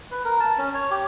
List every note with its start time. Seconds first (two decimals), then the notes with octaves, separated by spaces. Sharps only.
0.11 B4
0.25 A#4
0.40 A5
0.58 C#4
0.74 C#5
0.91 G4